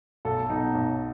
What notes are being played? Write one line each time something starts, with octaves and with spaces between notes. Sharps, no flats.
B1 A4
B2 F#3 D#4
B1